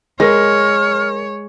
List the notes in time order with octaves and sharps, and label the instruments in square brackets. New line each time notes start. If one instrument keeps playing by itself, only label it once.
[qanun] G#3 [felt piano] A#4 A#6 [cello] C#5 [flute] F6